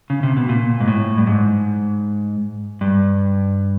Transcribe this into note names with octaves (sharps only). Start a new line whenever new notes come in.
C#3
C3
B2
A#2
G#2
A2
G2
G#2
G2